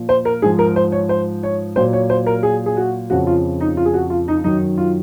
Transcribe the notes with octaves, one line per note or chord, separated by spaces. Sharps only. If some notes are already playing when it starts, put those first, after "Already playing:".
Already playing: A#2 F3
C5
A#4
G#2 F3 G#4
A#4
C5
C#5
C5
C#5
A#2 F#3 C5
C#5
C5
A#4
G#4
G#4
F#4
F2 C#3 F3 F#4
F4
D#4
F4
G#4
F#4
F4
D#4
F#2 D#3 F#3 D#4
F4